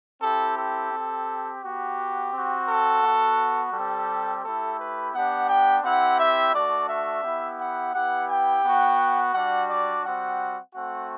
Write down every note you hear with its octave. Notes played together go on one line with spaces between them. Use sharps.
C4 E4 G4 A4
A4
C4 G4
B3 F#4 G4
C4 F#4
A4
B3 F#4
G3 C4 G4 A4
A3 E4 G4 A4
B4
B3 D4 G4 F#5
G5
C4 E4 G4 F#5
E5
A3 D4 F#4 D5
E5
B3 E4 G4
F#5
B3 E4 G4 F#5
G5
B3 F#4
G3 D4 F#4 F#5
D5
G3 C4 F#4 F#5
A3 C4 F#4 F#5